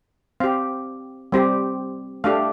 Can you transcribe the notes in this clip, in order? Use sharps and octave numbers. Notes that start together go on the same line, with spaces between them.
C4 G4 F5
G3 C4 G4
A3 D4 G4 F5